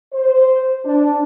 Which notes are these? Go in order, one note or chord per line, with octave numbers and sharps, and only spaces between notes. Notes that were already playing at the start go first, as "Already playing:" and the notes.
C5
D4